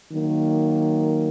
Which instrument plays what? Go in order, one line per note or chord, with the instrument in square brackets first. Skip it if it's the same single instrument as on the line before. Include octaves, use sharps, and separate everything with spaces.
[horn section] D#3 F#3 A#3